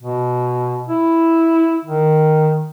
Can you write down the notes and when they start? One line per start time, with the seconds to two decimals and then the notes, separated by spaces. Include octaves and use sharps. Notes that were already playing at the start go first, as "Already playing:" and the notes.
0.01 B2
0.89 E4
1.85 D#3